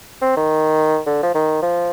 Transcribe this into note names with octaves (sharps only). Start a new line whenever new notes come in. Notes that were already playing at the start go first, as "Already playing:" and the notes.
C4
D#3
D3
F3
D#3
F3